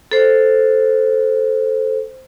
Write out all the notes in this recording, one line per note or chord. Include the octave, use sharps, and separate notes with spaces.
A4 C5